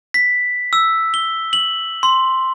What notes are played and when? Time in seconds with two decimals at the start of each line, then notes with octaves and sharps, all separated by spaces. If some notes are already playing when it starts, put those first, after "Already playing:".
0.14 B6
0.73 E6
1.14 G7
1.53 F#7
2.03 C6